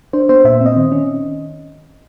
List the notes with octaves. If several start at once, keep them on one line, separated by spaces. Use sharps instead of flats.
D4 C5
B3 C5
A#2 E5
C4 D#5
D#3
C#4